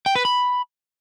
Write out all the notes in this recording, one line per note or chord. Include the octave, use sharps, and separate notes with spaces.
G5
B4
B5